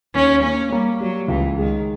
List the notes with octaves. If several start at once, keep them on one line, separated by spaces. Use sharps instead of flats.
D#2 C#4
A#3 C#4
G3 A#3
F#3 G3
C#2 E3
D#3 G#3